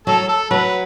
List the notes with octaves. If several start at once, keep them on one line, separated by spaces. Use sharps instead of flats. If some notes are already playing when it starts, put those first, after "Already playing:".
F#3 A4
A4
F#3 B4